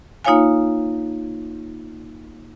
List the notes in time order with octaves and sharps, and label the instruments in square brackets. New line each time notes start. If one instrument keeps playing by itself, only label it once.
[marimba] A#3 D#4 F4 C#5 F5 G#5